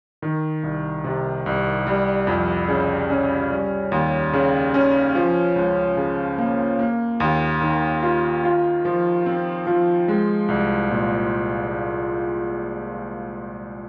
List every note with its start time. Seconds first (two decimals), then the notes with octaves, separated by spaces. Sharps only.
0.22 D#3
0.63 C2
1.04 C3
1.46 C2
1.87 G3
2.27 F2
2.68 C#3
3.10 C#4
3.51 G3
3.92 D#2
4.33 C#3
4.74 C#4
5.15 F3
5.56 C#2
5.97 C#3
6.38 A#3
6.79 A#3
7.20 D#2
7.61 D#3
8.03 F4
8.44 F4
8.85 F3
9.26 C4
9.67 F3
10.08 G#3
10.48 C2
10.90 A#2